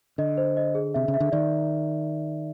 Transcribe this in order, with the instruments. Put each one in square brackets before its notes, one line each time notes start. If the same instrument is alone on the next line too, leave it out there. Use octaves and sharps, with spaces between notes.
[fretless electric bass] D3 [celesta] D#5
[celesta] C5
D#5
G#4
[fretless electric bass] C3 [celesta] E5
[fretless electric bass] C#3
[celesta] E5
[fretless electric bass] D3
[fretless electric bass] D#3 [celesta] D5